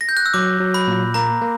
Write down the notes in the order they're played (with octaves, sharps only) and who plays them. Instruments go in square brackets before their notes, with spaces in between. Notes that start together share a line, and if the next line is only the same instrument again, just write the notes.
[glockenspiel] A#6
G6
F#6
E6
[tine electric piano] F#3 [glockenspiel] D6
[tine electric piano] F#3
[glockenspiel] B5
[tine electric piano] A#2
[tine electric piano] A#3 [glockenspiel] A#5
[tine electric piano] A#3